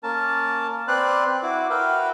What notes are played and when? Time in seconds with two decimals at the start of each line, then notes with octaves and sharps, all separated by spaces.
0.03 A#3 C#4 A#4 A5
0.88 C4 B4 C5 D5 F#6
1.43 E4 F#4 D6
1.70 F#4 A#4 B4 E5 F5 G5